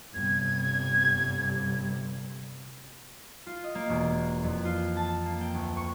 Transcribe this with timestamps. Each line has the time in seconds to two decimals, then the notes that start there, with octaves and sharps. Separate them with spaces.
0.14 G1 C3 G3 G#6
3.46 F4
3.64 D#5
3.75 A#3
3.89 E1
4.12 A#3
4.43 F2
4.65 F4
4.97 A5
5.26 A#3
5.41 G5
5.54 D2
5.77 C#6